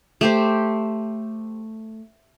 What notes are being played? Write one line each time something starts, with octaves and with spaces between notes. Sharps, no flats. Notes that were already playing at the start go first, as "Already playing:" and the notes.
A3 G4 C5